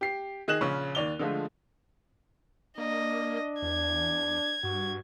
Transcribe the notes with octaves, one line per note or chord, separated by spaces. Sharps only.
G4 C7
D#3 G#4 D#5 F#6 E7 F#7
A#1 C#3 C#4 C#6
D#2 D5 F7 G7
D3 F3 G#3 A3 F4
A#3 D4 D#5
E2 G#6
G2 F#4